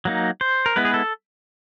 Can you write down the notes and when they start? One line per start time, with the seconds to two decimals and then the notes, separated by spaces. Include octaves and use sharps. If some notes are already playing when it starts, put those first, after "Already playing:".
0.05 F#3 A#3 D#4
0.41 C5
0.66 A#4
0.76 G#3 B3 E4 B4
0.85 G#4
0.94 A4